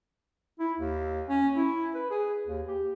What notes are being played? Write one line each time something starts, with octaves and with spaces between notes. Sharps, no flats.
E4
D#2
C#4
E4
B4
G#4
D#2
G4